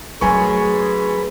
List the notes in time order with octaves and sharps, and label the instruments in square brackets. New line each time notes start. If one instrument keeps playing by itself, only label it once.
[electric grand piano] F#2 G#5 C#6 [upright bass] F#3 A3 [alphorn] G#4 [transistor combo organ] B4